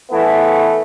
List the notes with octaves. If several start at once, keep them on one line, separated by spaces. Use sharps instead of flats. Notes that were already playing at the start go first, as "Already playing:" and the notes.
E3 A3 B3